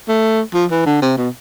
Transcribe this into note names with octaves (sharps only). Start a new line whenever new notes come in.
A3
F3
E3
D3
C3
B2